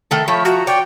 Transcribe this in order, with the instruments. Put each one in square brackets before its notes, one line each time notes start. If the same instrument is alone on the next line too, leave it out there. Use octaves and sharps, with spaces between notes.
[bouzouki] D#3 A3 A4
[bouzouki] F3 E5 [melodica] A3 C#5 B5
[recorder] F#4 [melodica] A#5
[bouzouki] C#5 [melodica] D5 [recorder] G5